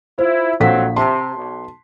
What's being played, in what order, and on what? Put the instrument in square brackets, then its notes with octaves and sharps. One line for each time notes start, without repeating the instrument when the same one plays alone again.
[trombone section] E4 [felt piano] F4 [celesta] C5
[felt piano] A#1 B6 [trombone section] F#3 C4 [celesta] A4 F5 F#5
[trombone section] C3 [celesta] A5 [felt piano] C6
[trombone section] B1